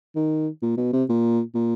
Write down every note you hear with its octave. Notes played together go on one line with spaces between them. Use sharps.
D#3
A#2
B2
C3
A#2
A#2